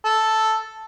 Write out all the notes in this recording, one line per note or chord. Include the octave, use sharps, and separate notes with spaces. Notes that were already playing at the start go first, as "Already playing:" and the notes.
A4